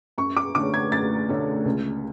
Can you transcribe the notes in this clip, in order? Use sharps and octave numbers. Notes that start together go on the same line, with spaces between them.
F#2 C#6
D6
D3 A3 C#4 D6
G#6
F#2 A6
D3 A3 C#4
C#2